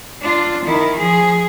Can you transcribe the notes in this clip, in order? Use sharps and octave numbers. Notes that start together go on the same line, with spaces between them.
D4 F4
D#3 E4
F3 G#4